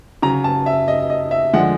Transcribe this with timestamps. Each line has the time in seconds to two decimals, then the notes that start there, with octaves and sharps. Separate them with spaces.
0.22 C#3 F#3 A#5
0.44 A5
0.66 E5
0.88 D#5
1.10 D#5
1.31 E5
1.53 D3 F3 G#3 F#5